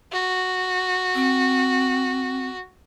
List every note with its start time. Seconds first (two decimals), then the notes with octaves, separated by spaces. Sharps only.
0.12 F#4
1.15 C4